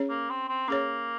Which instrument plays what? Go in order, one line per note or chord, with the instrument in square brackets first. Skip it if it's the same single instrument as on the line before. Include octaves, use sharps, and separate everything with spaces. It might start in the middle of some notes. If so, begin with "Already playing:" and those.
Already playing: [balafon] C#4 G#4 C#5
[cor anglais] A#3
C4
C4
[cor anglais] A#3 [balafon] C#4 G#4 C#5